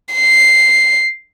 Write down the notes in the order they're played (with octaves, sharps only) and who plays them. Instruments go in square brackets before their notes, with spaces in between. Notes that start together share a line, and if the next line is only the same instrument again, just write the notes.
[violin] C7